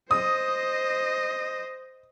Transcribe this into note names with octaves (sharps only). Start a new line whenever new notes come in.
C5 D#5 D#6